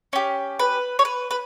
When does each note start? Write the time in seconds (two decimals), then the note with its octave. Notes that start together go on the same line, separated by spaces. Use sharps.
0.13 C#4 G4
0.59 B4
0.99 C#5
1.05 B4
1.31 B4